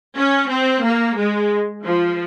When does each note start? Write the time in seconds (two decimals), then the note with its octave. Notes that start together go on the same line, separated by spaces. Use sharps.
0.16 C#4
0.49 C4
0.83 A#3
1.17 G#3
1.84 F3